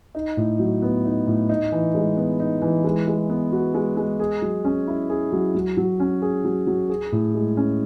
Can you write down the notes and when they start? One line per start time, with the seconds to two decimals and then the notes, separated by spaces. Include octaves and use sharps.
0.15 D#4
0.37 A2
0.59 F#3
0.82 B3
1.05 D#4
1.27 A2
1.49 D#4
1.72 E3
1.95 G#3
2.17 B3
2.40 D#4
2.62 E3
2.84 G#3
3.07 G#3
3.30 B3
3.52 F#4
3.74 G#3
3.97 G#3
4.20 G#4
4.42 F#3
4.64 C#4
4.87 E4
5.10 G#4
5.32 F#3
5.55 F#3
5.77 F#3
6.00 C#4
6.22 G#4
6.45 F#3
6.67 F#3
6.89 G#4
7.12 A2
7.34 G#3
7.57 C#4